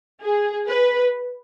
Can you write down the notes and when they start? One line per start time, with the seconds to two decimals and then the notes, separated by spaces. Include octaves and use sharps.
0.22 G#4
0.68 B4